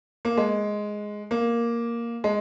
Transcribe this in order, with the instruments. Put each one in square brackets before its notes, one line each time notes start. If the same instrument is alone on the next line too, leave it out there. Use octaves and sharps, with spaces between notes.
[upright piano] A#3
G#3
A#3
G#3